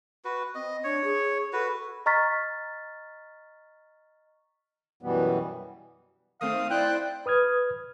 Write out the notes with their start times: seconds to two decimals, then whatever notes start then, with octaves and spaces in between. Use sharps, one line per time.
0.25 F#4 B4
0.55 C4 D#5
0.84 D4 C#5
1.04 G#4
1.53 F#4 A4 B4
2.06 D#5 A#5 C#6 F6 A6 B6
5.03 F#2 B2 E3 G3 B3
6.41 D#3 A3 C4 F5 D#6
6.70 E4 C5 D5 G5 F#6
7.26 B4 D#6 F6 G#6